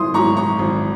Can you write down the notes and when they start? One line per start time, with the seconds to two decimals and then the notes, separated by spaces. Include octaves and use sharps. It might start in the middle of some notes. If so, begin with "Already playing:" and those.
Already playing: G#1 C6 D#6
0.14 G#2 F#3 A#5 C#6
0.37 A#5 C#6
0.59 G#1